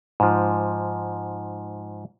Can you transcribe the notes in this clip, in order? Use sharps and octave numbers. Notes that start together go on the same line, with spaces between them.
G#2 F3